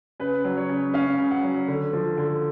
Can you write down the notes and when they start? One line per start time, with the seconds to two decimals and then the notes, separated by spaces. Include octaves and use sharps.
0.20 C#3 B4
0.44 F#3
0.57 C#5
0.69 C#3
0.94 C#4 F5
1.18 C#3
1.31 F#5
1.43 F#3
1.68 D3
1.93 F3
2.18 D3